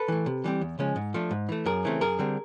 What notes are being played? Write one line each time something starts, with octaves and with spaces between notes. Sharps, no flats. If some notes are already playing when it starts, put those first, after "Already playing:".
Already playing: A4 B4
E3 A3
C3
E3 G3 C4
E2
C#3 F3 G#3 C#4
G#2
F3 A3 D4
G#2
E3 A3
F#2 G#4 A#4
C#3 E3 A3 C4
F#2 G#4 A#4
D3 G3 C4